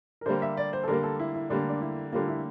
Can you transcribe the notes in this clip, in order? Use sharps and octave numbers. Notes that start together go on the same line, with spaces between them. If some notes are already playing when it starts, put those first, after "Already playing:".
A#4
D3 G3 A#3 C5
E5
D5
C5
A4
D3 G3 A#3 A#4
A4
E4
E4
D3 G3 A#3 D4
D4
E4
D3 G3 A#3 F4
E4